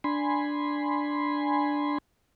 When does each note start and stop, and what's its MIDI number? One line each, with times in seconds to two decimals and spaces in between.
0.04 1.98 62
0.04 1.98 80
0.04 1.98 83
0.04 1.98 84